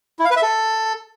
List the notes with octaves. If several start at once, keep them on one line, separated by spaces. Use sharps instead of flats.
E4
F5
B4
E5
A4